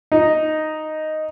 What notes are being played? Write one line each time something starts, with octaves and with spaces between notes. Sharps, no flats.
D#4